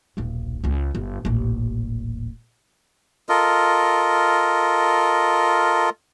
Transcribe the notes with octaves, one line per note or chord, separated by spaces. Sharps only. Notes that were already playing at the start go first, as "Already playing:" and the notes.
D#1 B1
C#2 C#4
G1
D#1 A1
F4 A4 A#4 D#5